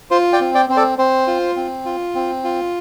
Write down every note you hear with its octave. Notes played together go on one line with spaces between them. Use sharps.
F4 C5
D5 G5
C4
D5 G5
C4 C5
A4 D5
C4 C5
F4
C4
F4
C4
F4